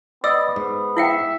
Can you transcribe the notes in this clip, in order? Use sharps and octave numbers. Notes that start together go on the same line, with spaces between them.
B3 D5 D#5 E6
G#2
E4 E5 F#5 G5